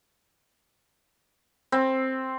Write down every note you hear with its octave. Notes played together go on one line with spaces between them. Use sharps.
C4